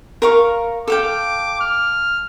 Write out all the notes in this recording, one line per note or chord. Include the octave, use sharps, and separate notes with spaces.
A#4 F5 C#6
A4 F5 G5 D6
F6